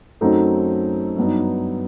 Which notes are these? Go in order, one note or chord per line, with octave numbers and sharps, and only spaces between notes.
F#2 F#3 A3 C4 D#4
G2 F#3 B3 D#4